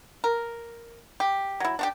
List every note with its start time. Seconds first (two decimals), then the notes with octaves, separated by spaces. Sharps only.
0.24 A#4
1.20 G4
1.60 F#3 E4
1.79 D4 F#4 G4